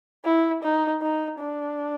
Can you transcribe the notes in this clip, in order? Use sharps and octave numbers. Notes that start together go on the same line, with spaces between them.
E4
D#4
D#4
D4